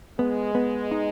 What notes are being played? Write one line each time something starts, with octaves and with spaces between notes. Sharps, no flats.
G#3 B3
B3
D#4